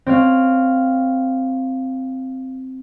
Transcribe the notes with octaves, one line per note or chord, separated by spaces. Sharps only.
C4 C#5 F5